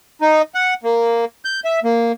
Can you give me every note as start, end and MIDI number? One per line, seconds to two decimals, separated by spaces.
0.21 0.42 63
0.55 0.74 78
0.84 1.25 58
1.45 1.60 91
1.65 1.80 76
1.84 2.12 58